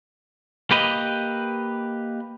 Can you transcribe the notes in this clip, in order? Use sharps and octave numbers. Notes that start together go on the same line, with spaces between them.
A#3 G4 B4 D#5